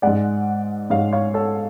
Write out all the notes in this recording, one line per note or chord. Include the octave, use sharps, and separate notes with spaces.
G#2 G#3 D5 F#5
G#2 G#3 C#5 F5
C#5 F5
A4 C#5